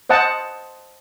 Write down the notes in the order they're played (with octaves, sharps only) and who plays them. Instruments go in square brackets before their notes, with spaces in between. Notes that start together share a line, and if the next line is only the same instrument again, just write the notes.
[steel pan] C5 D#5 F#5 A5